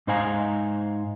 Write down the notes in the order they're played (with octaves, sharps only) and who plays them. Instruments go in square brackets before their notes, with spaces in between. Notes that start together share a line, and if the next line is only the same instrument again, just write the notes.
[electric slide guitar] G#2 D#4 C5 F5 G#5 A#5